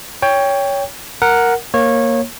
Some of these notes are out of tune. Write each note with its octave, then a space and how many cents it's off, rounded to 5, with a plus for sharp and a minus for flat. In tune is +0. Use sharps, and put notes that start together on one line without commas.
C#5 +15 G5 +15
A#4 +0 F#5 -5
A#3 +0 C#5 -20